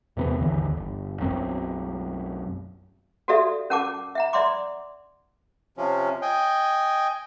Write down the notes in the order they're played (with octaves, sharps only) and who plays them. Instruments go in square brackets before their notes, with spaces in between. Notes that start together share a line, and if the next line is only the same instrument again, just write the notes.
[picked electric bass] E2 C3 B3
G#1 D#2 D3 E3
G1
B1 F#2 F#3 C4
[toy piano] F#4 G4 A4 D5 E5 F5
C#4 A#4 F#5 A5 D6
E5 F#5 A#5
D5 E5 F#5 C6 D6
[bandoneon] C3 F3 C#4
D#5 G5 G#5